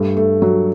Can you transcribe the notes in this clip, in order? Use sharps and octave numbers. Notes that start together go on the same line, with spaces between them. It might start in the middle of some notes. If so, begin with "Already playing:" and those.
Already playing: G2 A3
A3
F#3